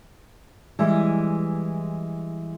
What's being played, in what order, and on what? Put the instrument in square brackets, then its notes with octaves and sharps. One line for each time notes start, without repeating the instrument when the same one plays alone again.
[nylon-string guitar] E3 G3 G#3